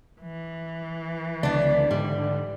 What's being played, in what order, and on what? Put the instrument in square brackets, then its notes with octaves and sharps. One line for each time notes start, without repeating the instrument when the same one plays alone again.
[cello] E3
[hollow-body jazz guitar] C#2 [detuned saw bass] D3 [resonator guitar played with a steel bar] B3 D4
[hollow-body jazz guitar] G#2 [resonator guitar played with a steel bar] G3